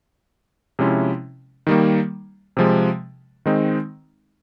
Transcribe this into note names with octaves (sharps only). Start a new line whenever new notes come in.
C3 F3 G#3 C#4 E4
D#3 G3 A#3
C3 F3 G#3
D#3 G#3 C4 D#4